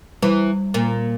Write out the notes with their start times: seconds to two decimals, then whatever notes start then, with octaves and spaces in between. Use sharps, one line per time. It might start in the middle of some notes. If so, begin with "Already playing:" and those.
0.23 E3 G3
0.74 A#2